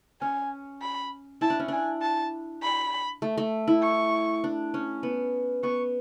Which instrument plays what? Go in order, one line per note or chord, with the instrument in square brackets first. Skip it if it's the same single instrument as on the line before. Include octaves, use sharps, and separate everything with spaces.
[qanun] C#4 [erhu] G#5
[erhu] B5
[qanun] E4 [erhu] A5
[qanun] D4
C#4
[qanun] D4 [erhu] G#5
[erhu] A5
B5
[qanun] A3
A3
E4
[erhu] C#6
[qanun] D4
C#4
B3
[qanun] B3 [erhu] C#6